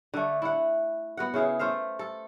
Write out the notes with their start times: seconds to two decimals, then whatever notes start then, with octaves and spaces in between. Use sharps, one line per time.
0.14 D3 A3
0.42 E4 F#5
1.17 B3 F#4 F#5
1.34 C#3 E4 G#4 F5
1.59 A3 C5 E5 F5
1.99 A4